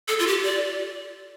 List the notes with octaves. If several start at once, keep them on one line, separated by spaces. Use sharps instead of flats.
A4
F4
G4
D5